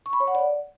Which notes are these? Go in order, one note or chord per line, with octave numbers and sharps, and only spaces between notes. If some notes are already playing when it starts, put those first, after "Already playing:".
C#6
B5
C#5
F#5
D5